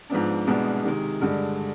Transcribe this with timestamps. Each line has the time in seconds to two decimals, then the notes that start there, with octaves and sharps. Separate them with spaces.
0.10 G#2 F3 B3 D4
0.47 C2 B2 G#3 B3 D4
0.85 C3 D#3 G#3
1.21 G2 D3 G#3 D4